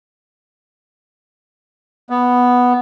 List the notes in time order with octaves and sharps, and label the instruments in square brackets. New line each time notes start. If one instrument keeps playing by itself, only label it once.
[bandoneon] B3